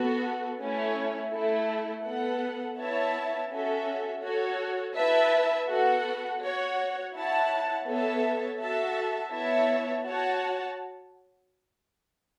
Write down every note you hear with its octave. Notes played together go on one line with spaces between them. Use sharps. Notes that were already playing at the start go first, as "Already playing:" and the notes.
Already playing: B3 F#4 A4
A3 C#4 E4 C#5
A3 E4 A4
B3 A4 F#5
B3 E4 C#5 E5 A5
C#4 F#4 A4 E5
F#4 A4 C#5
E4 B4 E5 A5
B3 F#4 A4 F#5
F#4 C#5 F#5
E4 C#5 F#5 A5
B3 A4 C#5 E5 A5
F#4 A4 E5 A5
B3 E4 C#5 E5 A5
F#4 C#5 F#5 A5